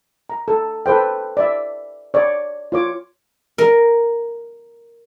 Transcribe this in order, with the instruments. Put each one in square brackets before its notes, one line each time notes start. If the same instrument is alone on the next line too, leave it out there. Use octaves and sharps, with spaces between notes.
[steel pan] A#5
A4
A4 B4 C5 G5
D5 E5
C#5 D5
F4 C#5 D6
[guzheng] A#4